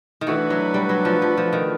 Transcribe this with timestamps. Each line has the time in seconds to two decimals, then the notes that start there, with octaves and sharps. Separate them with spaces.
0.21 D#3
0.27 E3 A3 D4 F#4 B4
0.50 F#3
0.74 G3
0.89 F#3
1.05 F3
1.22 F3
1.37 F3
1.53 D#3